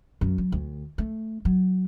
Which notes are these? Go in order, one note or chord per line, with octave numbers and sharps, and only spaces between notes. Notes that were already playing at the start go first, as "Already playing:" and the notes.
F#2
F#3
D2
A3
F#3